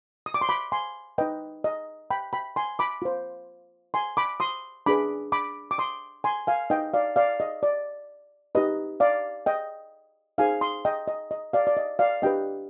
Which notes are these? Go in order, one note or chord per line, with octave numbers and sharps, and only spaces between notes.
D#6
D6
C6
B5 D6
G#5 C6
D#4 B4 D#5 G5
D#5
G5 B5
G5 B5
G#5 C6
B5 D6
F4 C5
G#5 C6
B5 D6
C6 D#6
D4 G#4 B4 B5 D6
B5 D6
D6
C6 D#6
G#5 C6
F5 G#5
D#4 B4 D#5 G5
D5 F5
D5 F5
D#5
D5
D#4 G4 B4 D#5
D5 F5
D#5 G5
D#4 G#4 C5 F5 G#5
C6 D#6
D#5 G5
D#5
D#5
D5 F5
D5
D#5
D5 F5
D4 G4 B4 D#5 G5